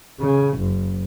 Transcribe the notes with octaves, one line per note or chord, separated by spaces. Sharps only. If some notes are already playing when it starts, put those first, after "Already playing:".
C#3
F#1